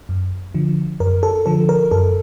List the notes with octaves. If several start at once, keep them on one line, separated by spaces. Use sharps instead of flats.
F#2
D3 F3
F#2 A#4
A4
D3 F3 A4
A#4
F#2 A4